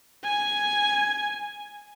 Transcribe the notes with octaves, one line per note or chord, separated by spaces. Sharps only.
G#5 G#6